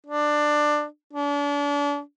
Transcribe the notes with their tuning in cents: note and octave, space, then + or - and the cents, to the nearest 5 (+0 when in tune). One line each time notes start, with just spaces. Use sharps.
D4 +15
D4 -35